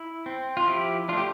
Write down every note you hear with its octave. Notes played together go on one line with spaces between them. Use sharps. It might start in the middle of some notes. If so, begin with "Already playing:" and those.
Already playing: E4
C4
F4
F3 E4 G4
A3 D4 F4 G4